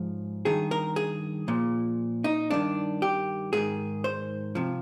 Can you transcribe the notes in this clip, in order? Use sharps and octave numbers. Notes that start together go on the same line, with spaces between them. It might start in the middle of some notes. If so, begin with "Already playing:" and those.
Already playing: G#2 F3
G2 D#3 G#4
A#4
G#4
A#2 F3
D#4
G2 D#3 D4
G4
G#2 D#3 G#4
C5
C3 F3